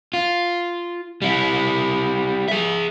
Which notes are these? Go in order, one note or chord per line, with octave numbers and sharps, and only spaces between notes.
F4
G3 E4
G#4 E5